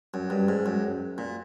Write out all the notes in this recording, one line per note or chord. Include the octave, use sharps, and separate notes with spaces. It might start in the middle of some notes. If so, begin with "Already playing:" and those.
F#2
G2
G#2
F#2
A#2